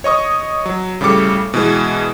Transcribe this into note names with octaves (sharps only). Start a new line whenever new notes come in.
C#5 D#5 C#6 D#6
F#3
A2 C#3 G3 A4 D6 C#7
B2 E3 G#3